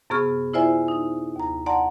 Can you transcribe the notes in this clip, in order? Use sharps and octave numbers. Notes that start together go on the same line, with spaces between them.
F#2 C3 B3 G#4 C#6 F6
E4 F4 C5 D5 E5 G#5
D#4
D#2 A#5
D5 F#5 A5 A#5 C6